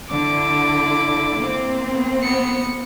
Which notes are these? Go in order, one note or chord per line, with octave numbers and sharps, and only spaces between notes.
D3 E4 D6
A#3 C4
B3 C#7